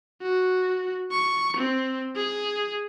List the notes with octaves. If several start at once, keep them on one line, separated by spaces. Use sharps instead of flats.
F#4
C#6
C4
G#4